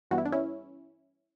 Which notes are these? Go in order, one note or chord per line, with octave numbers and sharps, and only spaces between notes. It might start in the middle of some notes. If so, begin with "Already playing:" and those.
G2 E3 G3 B3 F#4
E4
D4
C#4 E4